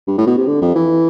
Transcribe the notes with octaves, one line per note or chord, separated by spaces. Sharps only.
G2
A2
B2
C3
D3
F2
E3